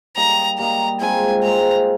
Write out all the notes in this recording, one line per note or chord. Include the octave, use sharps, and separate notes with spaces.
G3 A#3 D#4 A#5
G3 A#3 D#4 A#5
G#3 C4 F4 C5 G#5
G#3 C4 F4 C5 A#5